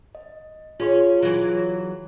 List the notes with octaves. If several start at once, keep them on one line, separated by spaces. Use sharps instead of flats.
D#5
C#4 F4 G#4 C#5 C6
E3 F#3